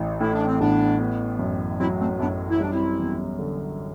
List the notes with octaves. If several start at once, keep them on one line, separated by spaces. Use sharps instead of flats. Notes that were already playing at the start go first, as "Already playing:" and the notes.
Already playing: A1 E3
A2 E4
D4
C4
A1 B3 D4
B3
F#2
F#3 C4 E4
A3 C4
F#2 B3 D4
E4
G3 D4
C4 E4
E2
D3